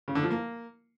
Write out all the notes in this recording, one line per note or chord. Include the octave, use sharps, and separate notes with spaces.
C#3
D3
F3
A#3